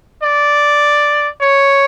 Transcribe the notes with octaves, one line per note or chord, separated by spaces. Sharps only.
D5
C#5